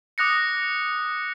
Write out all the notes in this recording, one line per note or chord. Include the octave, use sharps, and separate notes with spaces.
D6 D#6 F#6 A#6 C#7